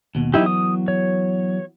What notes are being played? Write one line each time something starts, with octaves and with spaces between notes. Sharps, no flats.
D#2 B2
E3 F#3 B3 D#4 E4 G4
D#6
C#5